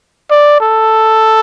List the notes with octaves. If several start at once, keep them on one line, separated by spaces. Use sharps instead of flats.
D5
A4